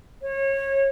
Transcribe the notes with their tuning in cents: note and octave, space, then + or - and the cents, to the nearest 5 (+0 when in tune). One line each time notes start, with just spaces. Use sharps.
C#5 -25